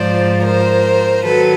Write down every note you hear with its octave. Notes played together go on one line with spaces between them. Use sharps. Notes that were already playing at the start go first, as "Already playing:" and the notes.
Already playing: G#2 F3 C5 D5
A#4 C5
D#3 F#3 A4 B4